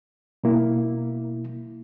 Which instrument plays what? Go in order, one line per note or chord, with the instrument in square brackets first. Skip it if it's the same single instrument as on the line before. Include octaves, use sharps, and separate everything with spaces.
[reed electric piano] B2 A#3 E4